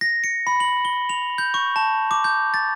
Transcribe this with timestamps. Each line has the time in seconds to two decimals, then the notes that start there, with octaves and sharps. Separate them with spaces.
0.01 A#6
0.24 C#7
0.47 B5
0.60 F#7
0.85 G7
1.09 F7
1.38 G6
1.54 C#6
1.76 A5
2.11 D6
2.24 G6
2.54 A6